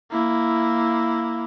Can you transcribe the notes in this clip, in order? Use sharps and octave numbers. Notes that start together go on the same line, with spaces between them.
A#3 E4